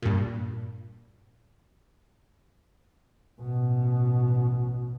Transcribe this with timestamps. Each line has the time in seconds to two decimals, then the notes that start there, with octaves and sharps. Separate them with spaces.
0.02 G2 A#2
3.40 A1 B2